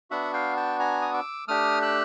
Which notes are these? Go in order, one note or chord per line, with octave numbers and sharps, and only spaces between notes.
B3 D4 F#4 E5 F#5
F5 G5
G5 A5
G#5 A#5
D#6
D6 E6
A3 D4 G4 D#6 F6
E6 F#6